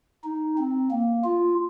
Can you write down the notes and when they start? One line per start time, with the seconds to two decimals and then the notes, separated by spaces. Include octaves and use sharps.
0.24 D#4
0.58 C4
0.92 A#3
1.25 F4